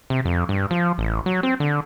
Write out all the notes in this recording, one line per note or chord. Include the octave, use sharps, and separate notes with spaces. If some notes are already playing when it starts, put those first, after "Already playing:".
C3
F2
G2
F3
A1
F#3
C4
D3